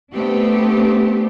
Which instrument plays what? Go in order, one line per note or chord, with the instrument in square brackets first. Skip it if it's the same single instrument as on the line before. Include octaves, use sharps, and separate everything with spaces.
[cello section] A3 B3 C4 D4 G4